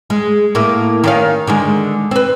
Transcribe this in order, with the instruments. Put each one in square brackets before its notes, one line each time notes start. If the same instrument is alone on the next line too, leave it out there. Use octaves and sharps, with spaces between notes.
[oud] G#3
A2 A#3 E4
D#3 C#4 F5
D3 D#3 G#3
C4 B4